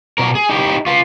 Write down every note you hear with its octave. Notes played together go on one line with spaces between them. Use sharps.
B2 A#4
G#4
D#4 E4 G4
F4 B4